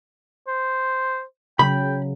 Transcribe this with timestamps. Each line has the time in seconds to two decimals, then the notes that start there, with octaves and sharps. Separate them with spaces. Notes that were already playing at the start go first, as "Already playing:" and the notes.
0.47 C5
1.59 C#3 F#3 G5 B5